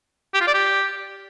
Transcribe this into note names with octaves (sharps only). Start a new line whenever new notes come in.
G4
F4
D5
G4